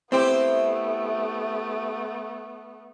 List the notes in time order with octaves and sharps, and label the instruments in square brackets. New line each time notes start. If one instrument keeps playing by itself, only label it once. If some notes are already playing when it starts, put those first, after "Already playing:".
[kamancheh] A3 B3 [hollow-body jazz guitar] C4 C5 [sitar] E4 G4